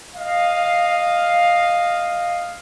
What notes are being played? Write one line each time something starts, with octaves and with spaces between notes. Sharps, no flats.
D#5 F5